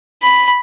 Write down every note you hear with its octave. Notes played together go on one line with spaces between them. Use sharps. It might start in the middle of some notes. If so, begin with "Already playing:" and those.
B5